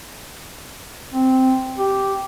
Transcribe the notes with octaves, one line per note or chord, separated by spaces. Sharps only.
C4
G4